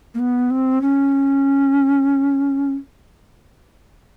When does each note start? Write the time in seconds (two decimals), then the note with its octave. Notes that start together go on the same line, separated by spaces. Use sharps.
0.14 A#3
0.19 B3
0.50 C4
0.81 C#4